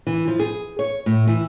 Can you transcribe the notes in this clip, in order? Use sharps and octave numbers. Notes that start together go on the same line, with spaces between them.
E3
F3
G#4
C#5
A2
E3